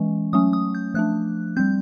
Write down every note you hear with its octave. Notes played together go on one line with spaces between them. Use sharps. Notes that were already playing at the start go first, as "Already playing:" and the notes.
Already playing: E3 G#3 C#4
F#3 A3 C#4 D#6
D#6
G6
F3 A3 D4 F#6
G3 C4 G6